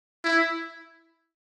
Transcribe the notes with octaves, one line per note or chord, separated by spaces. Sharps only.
E4